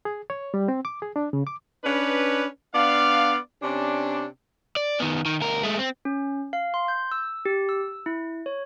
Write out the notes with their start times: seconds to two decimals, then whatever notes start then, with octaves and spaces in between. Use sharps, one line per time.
0.05 G#4
0.30 C#5
0.54 G3
0.68 C4
0.85 D6
1.02 G#4
1.16 D4
1.33 C#3
1.47 D6
1.84 C#4 D4 B4
2.74 B3 D4 D5 F5
3.62 C3 C#4 D4
4.76 D5
5.00 D#3 B3
5.26 D#3
5.40 D2 A#4
5.63 G#3 A3
5.79 C4
6.05 C#4
6.53 F5
6.74 C6
6.88 G6
7.12 E6
7.45 G4
7.69 E6
8.06 E4
8.46 C#5